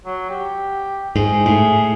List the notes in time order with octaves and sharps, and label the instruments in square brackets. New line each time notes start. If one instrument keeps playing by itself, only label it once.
[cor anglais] F#3
G4
[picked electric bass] G#2 [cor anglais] G#4
[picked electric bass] A2